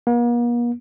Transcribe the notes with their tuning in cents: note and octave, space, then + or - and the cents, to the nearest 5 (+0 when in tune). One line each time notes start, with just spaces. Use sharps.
A#3 +45